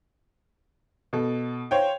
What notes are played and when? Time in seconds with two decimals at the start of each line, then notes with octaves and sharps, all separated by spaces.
1.13 B2 A4
1.71 C5 C#5 F5 G5